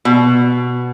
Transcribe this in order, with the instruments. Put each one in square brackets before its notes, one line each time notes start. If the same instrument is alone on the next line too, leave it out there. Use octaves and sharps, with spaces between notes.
[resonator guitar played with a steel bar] B2